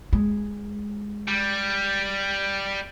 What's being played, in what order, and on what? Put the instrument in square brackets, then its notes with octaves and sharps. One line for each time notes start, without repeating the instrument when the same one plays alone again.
[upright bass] G#3
[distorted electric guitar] G3